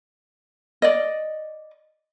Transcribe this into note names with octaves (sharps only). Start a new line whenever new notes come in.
D5 D#5